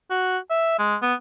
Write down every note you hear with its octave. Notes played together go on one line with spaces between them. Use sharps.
F#4
E5
G#3
B3